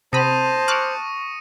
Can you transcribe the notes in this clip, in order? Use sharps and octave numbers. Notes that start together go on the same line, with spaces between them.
C3 C5 A5 B5 D#6 A#6 D#7
C#6 D6 F6 F#6 C#7